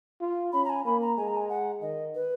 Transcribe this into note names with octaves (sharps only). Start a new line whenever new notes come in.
F4
C#4 B5
A#5
G#5
A#3 B5
A#5
G#3 G#5
A#5
G#5
F#5
D#3 D#5
B4